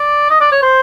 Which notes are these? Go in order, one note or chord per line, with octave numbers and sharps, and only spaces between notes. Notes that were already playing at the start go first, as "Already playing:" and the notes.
Already playing: D5
D#5
D5
C#5
C5